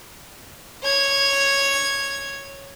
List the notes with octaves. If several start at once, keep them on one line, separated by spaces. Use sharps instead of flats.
C#5 G#6